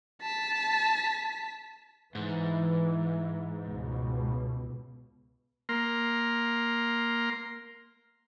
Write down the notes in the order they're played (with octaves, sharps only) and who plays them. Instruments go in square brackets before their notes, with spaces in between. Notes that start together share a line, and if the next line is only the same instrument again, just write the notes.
[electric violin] A5 B6
[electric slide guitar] G#2 [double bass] E3
[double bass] C#2 B2
[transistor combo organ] A#3 A#5 C6